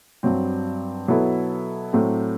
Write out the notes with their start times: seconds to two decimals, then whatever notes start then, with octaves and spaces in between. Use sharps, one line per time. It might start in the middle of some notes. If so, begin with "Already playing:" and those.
0.23 G2 F#3 C4
1.08 B2 F#3 B3 E4 A4
1.93 A2 F#3 A3 C4